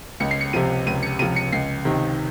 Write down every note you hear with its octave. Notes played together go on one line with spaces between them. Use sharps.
C#2 C#7
C7
C#7
C3 F3 D#7
C#2 D#7
C#7
C3 F3 D#7
C#7
C#2 C7
C3 D#3